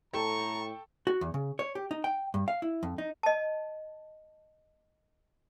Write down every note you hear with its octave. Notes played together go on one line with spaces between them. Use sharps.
A2 A4 G5 A5 A#5 C#6
F#4
E2
C#3
C#5
G4
D#4
G5
G2
F5
E4
F2
D#4
D#5 A5